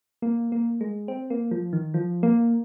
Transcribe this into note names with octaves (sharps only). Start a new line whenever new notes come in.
A#3
A#3
G#3
C4
A#3
F3
D#3
F3
A#3